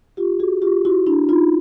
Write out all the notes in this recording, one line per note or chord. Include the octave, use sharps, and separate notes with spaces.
F4 G4
F#4 G#4
F4 G4
E4 F#4
D4 E4
D#4 F4